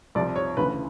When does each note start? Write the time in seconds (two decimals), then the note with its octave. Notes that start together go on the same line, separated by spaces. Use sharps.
0.15 C2 C3 F3 D5
0.36 C#5
0.57 D2 C#3 E3 B4